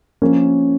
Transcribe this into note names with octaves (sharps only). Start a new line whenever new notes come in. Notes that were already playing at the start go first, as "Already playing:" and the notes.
F3 A#3 C#4